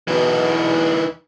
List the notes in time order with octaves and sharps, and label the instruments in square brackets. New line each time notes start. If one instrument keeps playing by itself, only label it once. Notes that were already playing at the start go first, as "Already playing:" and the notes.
[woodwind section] E2 B2 [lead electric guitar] E3 D#4